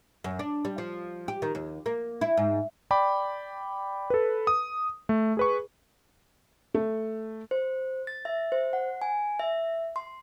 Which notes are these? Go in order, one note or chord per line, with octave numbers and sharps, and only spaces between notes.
F#2
D4
G3
F3
G4
D#3
D#2
A#3
E4
G#2
D5 G5 B5 D6
A4 B4
D#6
A3
G#4 B4 C#6
A3
C5
A6
E5
C5
F#5
G#5
E5
C6